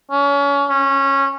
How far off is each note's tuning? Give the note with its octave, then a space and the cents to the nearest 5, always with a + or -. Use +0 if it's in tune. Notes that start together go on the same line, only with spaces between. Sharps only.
C#4 +30
C#4 -15